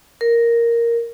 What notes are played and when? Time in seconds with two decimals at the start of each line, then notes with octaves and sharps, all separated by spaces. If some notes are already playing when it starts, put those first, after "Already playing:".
0.21 A#4